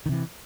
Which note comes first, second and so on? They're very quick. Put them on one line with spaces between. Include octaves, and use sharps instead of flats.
D#3 C3 E3